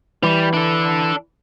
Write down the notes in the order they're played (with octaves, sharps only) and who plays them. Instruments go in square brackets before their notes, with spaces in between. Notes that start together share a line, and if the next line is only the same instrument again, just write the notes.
[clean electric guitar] E3 [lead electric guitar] G3
[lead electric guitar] D4 A4